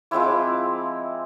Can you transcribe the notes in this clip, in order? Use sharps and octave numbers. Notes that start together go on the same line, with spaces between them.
F3 G#3 C4 E4 D6